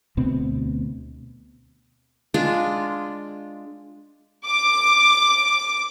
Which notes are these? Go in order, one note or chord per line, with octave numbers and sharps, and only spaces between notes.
D2 B2 B3 C4
G#3 D4 F4
D6